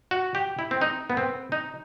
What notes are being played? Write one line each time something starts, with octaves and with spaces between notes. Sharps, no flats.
F#4
G4
E4
C4
D#4
B3
C4
D#4